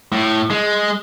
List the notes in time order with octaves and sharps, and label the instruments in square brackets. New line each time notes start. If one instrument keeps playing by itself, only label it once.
[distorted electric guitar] A2
G#3